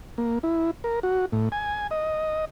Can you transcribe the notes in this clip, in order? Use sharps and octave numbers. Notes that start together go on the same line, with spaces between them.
A#3
E4
A#4
F#4
A2
G#5
D#5